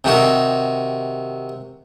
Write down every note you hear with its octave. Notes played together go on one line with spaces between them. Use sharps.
C3 D#3 F#4